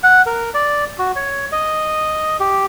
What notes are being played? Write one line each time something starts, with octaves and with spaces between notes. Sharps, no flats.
F#5
A#4
D5
F#4
C#5
D#5
G4